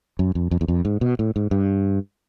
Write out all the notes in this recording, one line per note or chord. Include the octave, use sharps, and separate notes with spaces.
F#2
F2
F2
E2
F2
G#2
B2
A2
G#2
G2